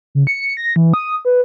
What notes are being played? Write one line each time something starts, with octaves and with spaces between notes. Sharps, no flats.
C#3
C#7
A#6
E3
D#6
B4